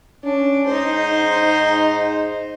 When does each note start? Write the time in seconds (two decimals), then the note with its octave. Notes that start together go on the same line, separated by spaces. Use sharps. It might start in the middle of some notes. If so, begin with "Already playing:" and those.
0.24 C#4 D4
0.67 G#2 D#4 C5